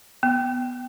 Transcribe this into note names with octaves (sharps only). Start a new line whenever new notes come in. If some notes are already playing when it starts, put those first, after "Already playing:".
B3